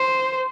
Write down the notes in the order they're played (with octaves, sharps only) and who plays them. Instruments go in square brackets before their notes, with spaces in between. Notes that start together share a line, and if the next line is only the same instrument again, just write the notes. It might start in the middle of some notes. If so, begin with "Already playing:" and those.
Already playing: [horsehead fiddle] C5